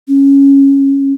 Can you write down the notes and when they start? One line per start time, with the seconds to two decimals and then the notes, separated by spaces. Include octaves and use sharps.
0.08 C#4